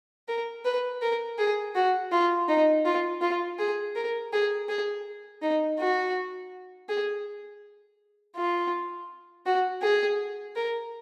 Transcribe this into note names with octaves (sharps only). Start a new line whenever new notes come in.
A#4
B4
A#4
G#4
F#4
F4
D#4
F4
F4
G#4
A#4
G#4
G#4
D#4
F#4
G#4
F4
F#4
G#4
A#4